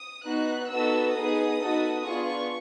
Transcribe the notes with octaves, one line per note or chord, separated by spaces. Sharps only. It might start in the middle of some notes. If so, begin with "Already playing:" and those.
Already playing: D#6
B3 D#4 F#4 F#6
B3 D#4 F#4 A4 E6
B3 D#4 G#4 D#6
B3 D#4 F#4 A4
B3 D4 F4 G#4 C#6